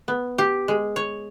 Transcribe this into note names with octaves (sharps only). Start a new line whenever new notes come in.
B3
G4
G#3
C#5